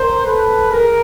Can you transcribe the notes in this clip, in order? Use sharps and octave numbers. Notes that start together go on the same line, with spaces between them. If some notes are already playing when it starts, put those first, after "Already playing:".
Already playing: A#4 C5
A4 B4
G#4 A#4